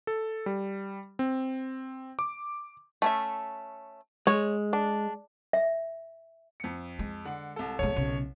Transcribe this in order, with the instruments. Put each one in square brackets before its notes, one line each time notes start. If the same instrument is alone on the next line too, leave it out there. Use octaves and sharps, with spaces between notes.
[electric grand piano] A4
G3
C4
D6
[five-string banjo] A3 C#4 E5
[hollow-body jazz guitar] G#3 [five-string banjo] C#5
[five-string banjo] D4
[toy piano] E5
[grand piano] F2 C#7
[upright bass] G#3
[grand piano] D3 F#5
C2 A4
[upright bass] B1 G#3 [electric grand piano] C#5
[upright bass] B1 C#3